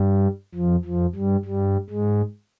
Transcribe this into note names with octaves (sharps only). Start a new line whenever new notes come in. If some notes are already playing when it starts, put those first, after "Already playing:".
Already playing: G2 G3
F2 F3
F2 F3
G2 G3
G2 G3
G#2 G#3